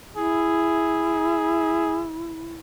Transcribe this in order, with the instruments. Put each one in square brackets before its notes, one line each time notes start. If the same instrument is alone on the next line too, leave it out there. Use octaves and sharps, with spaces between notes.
[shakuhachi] E4 [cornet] G#4